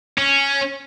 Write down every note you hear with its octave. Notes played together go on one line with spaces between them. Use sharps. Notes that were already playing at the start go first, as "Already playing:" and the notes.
C#4